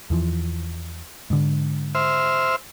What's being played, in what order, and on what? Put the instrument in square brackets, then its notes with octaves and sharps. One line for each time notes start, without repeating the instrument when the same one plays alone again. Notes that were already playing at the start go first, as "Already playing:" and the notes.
[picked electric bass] E2 E3 F3
G#2 D3
[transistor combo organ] C5 E5 F6